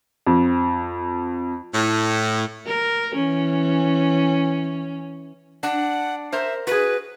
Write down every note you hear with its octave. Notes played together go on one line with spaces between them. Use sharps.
F2
A2
A#4
E3 C#4
D4 F#5
A#4 C5 E5
F#4 G#4 B4